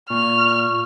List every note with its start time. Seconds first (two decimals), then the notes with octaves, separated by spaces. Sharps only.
0.10 A#2 C#6 F6